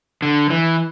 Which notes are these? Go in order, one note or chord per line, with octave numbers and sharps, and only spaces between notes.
D3
E3